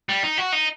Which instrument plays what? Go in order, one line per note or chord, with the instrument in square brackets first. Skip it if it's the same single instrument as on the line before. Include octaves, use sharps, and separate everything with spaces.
[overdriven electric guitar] G3
D#4
F#4
D#4